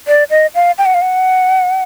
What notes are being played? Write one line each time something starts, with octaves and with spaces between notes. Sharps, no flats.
D5
D#5
F5
G5
F#5
F5
F#5